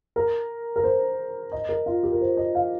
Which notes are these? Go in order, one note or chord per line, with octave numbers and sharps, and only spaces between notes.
A#4
A#4
C5
D#5
A#4
F4
G4
A#4
C5
D#5
F5